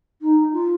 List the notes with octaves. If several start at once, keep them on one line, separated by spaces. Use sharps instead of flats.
D#4
F4